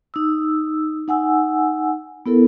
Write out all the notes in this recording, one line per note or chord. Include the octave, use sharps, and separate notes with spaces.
D#4 E6
D#4 F#5 G#5 E6
B3 E4 A4 A#4